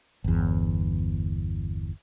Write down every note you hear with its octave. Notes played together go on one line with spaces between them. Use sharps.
G1 E2